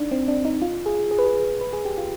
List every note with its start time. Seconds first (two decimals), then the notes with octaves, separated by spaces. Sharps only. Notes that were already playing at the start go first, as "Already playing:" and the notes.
Already playing: D4 D#4
0.11 C4
0.28 D4
0.45 D#4
0.62 F4
0.86 G#4
1.11 G#4
1.19 B4
1.25 G#4
1.61 B4
1.73 G#4
1.85 G4
1.98 F4